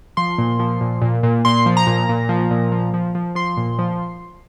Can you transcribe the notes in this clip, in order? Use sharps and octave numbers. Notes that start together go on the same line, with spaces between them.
F3 C6
A#2
F3
A#2
A#2
A#2
A#2 C6
F3
A#5
A#2
A#2
F3
A#2
F3
F3
F3
F3 C6
A#2
F3